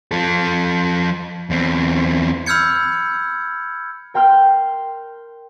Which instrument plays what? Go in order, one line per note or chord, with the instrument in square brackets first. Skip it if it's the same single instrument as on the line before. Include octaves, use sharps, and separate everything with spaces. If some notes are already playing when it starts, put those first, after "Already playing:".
[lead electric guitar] F3 A4
E2 C4
[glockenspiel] B5 E6 F6 G6 G#6 C#7
[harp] A#4 G5 C6 F6 G6